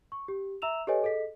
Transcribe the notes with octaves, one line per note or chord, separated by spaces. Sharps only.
C#6
G4
E5 A#5 E6 E7 F7
G4 A4 B4 C#5 D#5 G#5
G#4 A4 D#5 B6